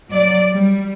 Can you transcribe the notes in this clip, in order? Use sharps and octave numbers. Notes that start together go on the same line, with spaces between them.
F#3 D5
G3